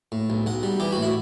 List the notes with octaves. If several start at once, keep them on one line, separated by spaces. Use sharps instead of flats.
A2
B1
B1 F#5
G3
E3 G4
A2 F#4
E4